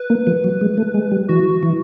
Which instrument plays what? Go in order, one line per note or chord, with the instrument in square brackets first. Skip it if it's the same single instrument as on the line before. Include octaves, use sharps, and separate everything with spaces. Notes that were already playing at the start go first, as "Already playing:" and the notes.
Already playing: [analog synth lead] B4
[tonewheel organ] A#3
F3
F#3
G#3
A3
G#3
G3
[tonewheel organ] E3 [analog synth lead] F#4
[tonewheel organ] E3